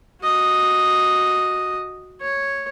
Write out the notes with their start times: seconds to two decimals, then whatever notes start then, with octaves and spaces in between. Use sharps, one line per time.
0.23 F#4 D#5
2.21 C#5